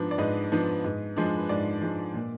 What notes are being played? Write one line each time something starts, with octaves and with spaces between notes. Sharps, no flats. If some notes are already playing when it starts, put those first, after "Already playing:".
Already playing: G#2 F3 B3 D4
D5
G#2 B4 D#5
F3 B3 D4
G#2
F3 G#3 D4
B4
G#2 D5
F3 G#3 D4
A#2